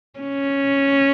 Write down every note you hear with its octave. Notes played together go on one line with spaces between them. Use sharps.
C#4